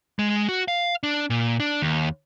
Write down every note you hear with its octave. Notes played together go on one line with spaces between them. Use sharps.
G#3
F#4
F5
D4
A#2
D4
D#2